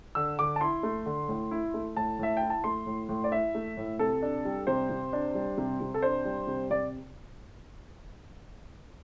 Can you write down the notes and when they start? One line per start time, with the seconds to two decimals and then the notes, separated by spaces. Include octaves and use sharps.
0.15 D3 E6
0.39 D3 D6
0.56 A5
0.61 E4 C6
0.83 A3
1.06 D3
1.28 A2
1.51 E4
1.74 A3
1.96 A2 A5
2.19 A2 E5
2.37 G5
2.42 E4
2.50 A5
2.64 A3 C6
2.86 A2
3.09 A2
3.24 D5
3.32 E4 E5
3.55 A3
3.77 A2
3.99 C3 A4
4.22 D4
4.45 G3
4.67 C3 C5
4.90 C3
5.13 D4
5.35 G3
5.58 C3
5.81 C3
5.94 A4
6.02 D4 C5
6.25 G3
6.47 C3
6.70 C3 D5